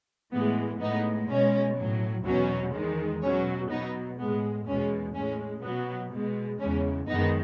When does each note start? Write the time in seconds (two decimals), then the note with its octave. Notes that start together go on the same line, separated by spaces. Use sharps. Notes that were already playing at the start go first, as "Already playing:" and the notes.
0.32 A2 E3 G#3 B3
0.80 A2 G#3 B3 D#4
1.29 B2 G#3 C#4
1.77 A2 F#3
2.25 E2 B2 F#3 C#4
2.74 E2 D#3 G#3
3.22 B2 F#3 C#4
3.70 B2 F#3 B3 D#4
4.18 A2 G#3 B3
4.67 E2 B2 G#3 C#4
5.15 A2 G#3 C#4
5.63 B2 F#3 B3
6.11 B2 G#3
6.59 E2 C#3 G#3 C#4
7.08 F#2 D#3 G#3 B3 D#4